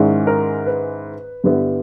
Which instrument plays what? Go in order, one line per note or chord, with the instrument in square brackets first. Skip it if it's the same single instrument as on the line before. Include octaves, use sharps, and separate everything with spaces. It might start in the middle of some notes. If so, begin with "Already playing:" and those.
Already playing: [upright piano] G#2 D#3 G#3 C#4 E4 D5
A#4
B4
G2 D3 G3 B3 E4